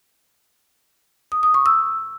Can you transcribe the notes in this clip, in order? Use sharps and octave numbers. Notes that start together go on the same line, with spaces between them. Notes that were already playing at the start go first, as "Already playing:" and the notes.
D#6
D#6
C#6
E6